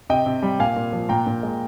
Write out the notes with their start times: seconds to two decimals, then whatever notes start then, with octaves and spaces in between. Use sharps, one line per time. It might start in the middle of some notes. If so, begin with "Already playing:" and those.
0.10 C3 D#5 G5
0.26 C3
0.42 G3
0.59 A#2 F5 G#5
0.77 A#2
0.93 F3
1.09 A#2 G5 A#5
1.27 A#2
1.43 G#3